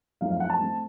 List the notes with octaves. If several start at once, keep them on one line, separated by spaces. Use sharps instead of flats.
F#2 F3 A3 C4 D#4 F5
F5
F#5
A5
A2 A3 C4